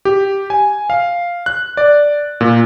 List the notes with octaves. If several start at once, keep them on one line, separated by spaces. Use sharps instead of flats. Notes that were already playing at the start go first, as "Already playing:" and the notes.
G4
G#5
F5
F#6
D5
A#2